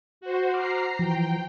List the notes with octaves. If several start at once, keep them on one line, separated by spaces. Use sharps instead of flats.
F#4 C5
A#5 D6 F6 F#6 C7
E3 F3 G5